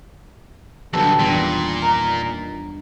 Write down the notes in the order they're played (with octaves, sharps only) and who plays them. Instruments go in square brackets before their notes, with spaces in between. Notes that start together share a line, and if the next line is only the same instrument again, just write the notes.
[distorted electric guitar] B1 F2 [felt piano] D3 F#3 G3 [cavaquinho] A4 B4 G5
[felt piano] E2 G2 D#3 [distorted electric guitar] A#2 [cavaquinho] G4 B4
[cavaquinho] D#4 A#4